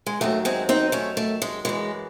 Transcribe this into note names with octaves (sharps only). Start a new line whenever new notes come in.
G#3
D#2 D#3 F#3 A3
G#3 C4
C4 D#4
A3 C#4
A3
G#3
F#2 E3 G#3